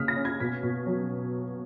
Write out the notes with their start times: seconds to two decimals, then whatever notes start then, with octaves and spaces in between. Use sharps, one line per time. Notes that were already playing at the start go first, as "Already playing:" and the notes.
Already playing: C#3 A#3 D#6 F6 B6
0.08 A#6
0.16 C#4
0.25 G#6
0.40 B2 B6
0.63 B2
0.86 F#3